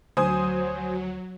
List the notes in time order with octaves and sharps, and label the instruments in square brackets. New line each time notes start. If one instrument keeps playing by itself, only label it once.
[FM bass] D2 [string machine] F#3 [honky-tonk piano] C5 G#5 D#6